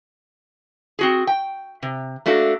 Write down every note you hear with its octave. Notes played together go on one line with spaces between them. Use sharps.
C4 F#4 G#4
G5
C3
A3 A#3 D4 F#4 A4